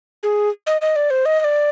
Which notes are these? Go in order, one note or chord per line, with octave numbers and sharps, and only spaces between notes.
G#4
D#5
D#5
D5
C5
D#5
D#5
D5